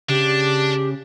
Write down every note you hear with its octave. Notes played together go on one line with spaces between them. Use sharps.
C#3 D4 G4